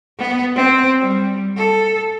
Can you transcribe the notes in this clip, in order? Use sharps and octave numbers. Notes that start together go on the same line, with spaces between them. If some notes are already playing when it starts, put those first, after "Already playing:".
B3
C4
G3
A4